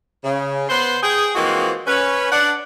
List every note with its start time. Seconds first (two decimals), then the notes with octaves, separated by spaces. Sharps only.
0.23 C#3
0.69 B3 B4 C5 C6
1.02 G#4 G5
1.34 E3 F3 G#3 A#3 C4 F#4
1.86 C#4 B4
2.31 D4 F#5